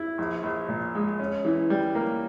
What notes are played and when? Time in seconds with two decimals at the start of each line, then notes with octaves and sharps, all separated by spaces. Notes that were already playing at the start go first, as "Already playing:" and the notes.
Already playing: E4
0.18 A#1
0.43 A#1
0.68 A#2
0.95 G#3
1.19 C#4
1.45 E3
1.70 G3
1.95 A#3